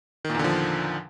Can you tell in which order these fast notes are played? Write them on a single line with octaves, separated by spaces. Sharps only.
D#3 A#2 E2 D3 F3